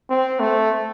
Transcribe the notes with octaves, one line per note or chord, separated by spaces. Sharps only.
C4
A3